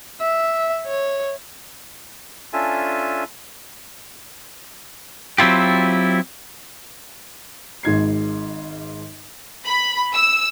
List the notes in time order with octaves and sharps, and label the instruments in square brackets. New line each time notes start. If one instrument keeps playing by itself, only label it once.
[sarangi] E5
C#5
[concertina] C#4 D4 F4 A4 E5 G#5
[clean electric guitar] F#3 C4 E4 F4 G4
[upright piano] G#1 G#2 G#6 C7
[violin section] B5
E6